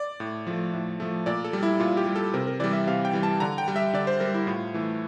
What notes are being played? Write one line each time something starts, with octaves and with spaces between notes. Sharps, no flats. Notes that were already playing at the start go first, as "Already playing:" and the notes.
Already playing: D5
A2
F3 A3
A2
F3 A3
A#2 D5
A4
G3
E4
A#2 F4
G4
G3
A4
C3 A#4
A#4
E3 G3 D5
E5
C3 F5
G5
E3 G3
A5
D3 A#5
G5
G3
E5
D3 D5
C5
G3 A#4
E4
A2 F4
E3 A3